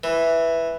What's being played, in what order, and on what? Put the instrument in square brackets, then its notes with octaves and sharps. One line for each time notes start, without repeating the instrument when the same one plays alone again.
[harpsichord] E3